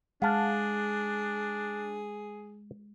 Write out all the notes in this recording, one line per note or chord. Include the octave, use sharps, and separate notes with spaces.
G#3 D4 G#4 F5 F#5 A5